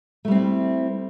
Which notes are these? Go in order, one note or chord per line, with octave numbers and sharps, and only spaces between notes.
G3 A3 C4 E4